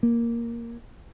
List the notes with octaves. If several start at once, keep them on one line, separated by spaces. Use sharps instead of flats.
A#3